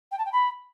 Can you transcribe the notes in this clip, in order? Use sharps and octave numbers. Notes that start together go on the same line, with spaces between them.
G5
A5
G5
B5